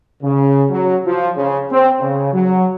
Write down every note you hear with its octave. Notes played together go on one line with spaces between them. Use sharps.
C#3
F#3
F3
C#3
C4
C#3
F#3